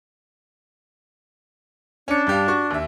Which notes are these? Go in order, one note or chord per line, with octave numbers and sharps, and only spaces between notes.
C#4 D4 C#7
G2 G4 F5
F#4 C#6
D#2 E5